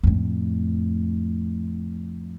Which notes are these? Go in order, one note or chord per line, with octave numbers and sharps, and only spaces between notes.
F2 A2